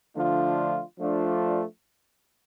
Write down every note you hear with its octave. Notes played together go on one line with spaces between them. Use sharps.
D3 F3 A3 D4 F4
F3 A3 D4 F4